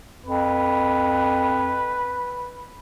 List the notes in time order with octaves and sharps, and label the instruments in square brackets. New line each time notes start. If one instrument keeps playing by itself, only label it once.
[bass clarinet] F2 [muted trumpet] B4